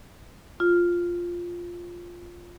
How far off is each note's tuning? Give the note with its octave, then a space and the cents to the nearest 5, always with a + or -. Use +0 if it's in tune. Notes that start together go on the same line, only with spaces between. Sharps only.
F4 +0